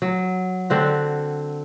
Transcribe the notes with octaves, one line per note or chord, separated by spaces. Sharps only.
F#3
D3 C4 F#4